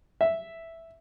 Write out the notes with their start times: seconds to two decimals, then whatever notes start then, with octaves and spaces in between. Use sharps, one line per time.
0.21 E5